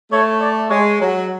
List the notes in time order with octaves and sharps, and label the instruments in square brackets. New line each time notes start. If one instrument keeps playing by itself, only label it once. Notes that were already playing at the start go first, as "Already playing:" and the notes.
[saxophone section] A3 [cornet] C#5
[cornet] D5
[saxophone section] G#3 [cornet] C#5
[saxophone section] F#3